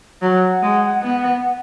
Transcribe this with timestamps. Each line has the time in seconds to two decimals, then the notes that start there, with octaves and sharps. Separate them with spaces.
0.21 F#3 F#5
0.62 G#3
1.02 B3